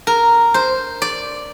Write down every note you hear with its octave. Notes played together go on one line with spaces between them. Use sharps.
A#4
C5
D5